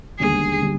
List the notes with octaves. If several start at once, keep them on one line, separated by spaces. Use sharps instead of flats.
E1 D#2 D3 G3 G#4
D3 G3